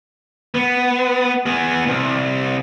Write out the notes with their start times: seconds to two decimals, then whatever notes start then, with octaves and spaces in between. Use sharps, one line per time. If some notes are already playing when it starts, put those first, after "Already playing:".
0.55 B3
1.46 B3 G#4
1.87 C2